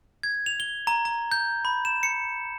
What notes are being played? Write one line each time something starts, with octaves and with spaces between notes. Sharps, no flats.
G#6
F7
G7
A#5
A#5
G6
B5
E7
C#7